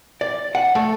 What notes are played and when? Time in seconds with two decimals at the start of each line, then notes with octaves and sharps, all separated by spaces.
0.21 D5
0.55 F#5
0.75 A3